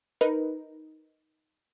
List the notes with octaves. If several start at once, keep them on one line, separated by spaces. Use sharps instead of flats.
D#4 A#4 B4